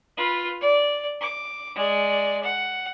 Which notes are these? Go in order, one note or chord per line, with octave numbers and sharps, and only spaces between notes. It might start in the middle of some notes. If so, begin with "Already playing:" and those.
F4 B4
D5
D6
G#3 D5
F#5